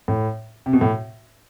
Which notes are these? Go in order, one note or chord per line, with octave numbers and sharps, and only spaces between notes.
A2
C3
B2
A2